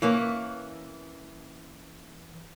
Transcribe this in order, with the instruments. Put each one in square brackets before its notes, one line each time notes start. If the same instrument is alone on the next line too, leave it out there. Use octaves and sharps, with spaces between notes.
[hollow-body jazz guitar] E3 A#3 C#4